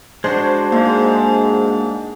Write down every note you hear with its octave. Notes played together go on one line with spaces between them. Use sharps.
G#3 D4 F#4 C5
G#2 A#3